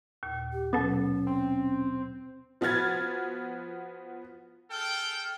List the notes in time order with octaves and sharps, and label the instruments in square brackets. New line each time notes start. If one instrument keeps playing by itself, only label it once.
[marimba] D#2 A#2
[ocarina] G4
[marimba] B2 F#3 [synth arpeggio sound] B3 A4 [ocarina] C#4
[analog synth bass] C4
[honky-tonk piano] F3 B3 F#4 F6 G#6 A6
[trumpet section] G#4 A4 G5 [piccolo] F6